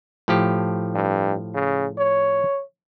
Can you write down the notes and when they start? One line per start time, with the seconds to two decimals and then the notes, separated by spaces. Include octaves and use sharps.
0.28 A2 F3 G4
0.95 G2
1.55 C#3
1.98 C#5